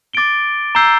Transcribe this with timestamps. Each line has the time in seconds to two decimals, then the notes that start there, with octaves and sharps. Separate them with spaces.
0.13 D6 A6 D7 G7
0.75 A#5 E6 G6 C7 G7